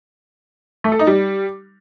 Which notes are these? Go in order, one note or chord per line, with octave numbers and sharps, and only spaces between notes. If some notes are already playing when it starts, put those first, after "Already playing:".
A3
A4
D#4
G3